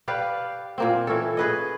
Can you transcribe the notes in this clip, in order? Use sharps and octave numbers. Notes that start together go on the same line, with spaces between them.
G4 B4 D5 F5
A#2 A#3 C4
E3 C#4 A4
G#4 B4 D#5